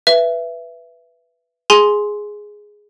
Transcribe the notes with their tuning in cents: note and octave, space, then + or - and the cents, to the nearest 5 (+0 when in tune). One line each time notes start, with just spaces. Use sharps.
B4 +0 E5 +20
G#4 +0 G#5 +10 C6 +0